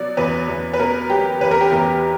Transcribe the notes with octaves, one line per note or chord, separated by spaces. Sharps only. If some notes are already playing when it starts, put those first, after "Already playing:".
Already playing: B2 F#3 D5
E2 B4
E2
B4
B2 A#4
F#3 G4
E2 B4
A#4
G4
E2 A#4